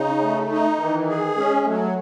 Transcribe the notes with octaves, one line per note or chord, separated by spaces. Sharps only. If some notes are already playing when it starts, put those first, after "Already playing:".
Already playing: C#3 D#4
A3
D#4
D#3 E3
G#4
G#3 C#4
F#3 A3